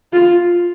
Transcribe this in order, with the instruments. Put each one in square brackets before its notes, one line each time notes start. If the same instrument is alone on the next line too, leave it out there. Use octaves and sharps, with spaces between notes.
[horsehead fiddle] F4